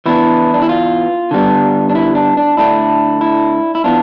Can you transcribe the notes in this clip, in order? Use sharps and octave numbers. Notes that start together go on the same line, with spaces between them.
E3 B3 D4 E4
D4
E4
F4
D3 G3 B3 D4
D4
E4
D4
D4
D3 A3 D4 E4
E4
E4
E3 B3 D4 F4